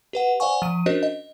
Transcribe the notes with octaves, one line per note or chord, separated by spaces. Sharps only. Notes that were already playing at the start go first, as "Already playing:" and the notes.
G4 B4 F#5
C5 D5 F5 F#5 G#5 C#6
F3 D#7
C#4 D4 F#4 A#4 C5 D#5
D#5